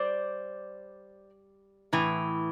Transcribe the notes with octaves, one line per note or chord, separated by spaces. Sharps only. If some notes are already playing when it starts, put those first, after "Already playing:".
Already playing: G3 C5 D5
A2 E3